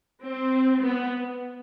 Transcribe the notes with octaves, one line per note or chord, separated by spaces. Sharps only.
C4
B3